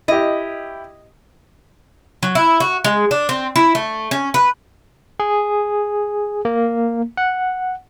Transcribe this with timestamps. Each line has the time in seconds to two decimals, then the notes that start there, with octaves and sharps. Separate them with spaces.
0.08 E4 G4 D#5
2.23 F#3
2.35 E4
2.60 F#4
2.85 G#3
3.11 D4
3.29 C4
3.56 E4
3.75 A3
4.11 C#4
4.34 B4
5.20 G#4
6.45 A#3
7.17 F#5